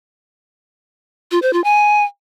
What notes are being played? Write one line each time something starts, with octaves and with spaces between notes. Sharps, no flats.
F4
C5
F4
G#5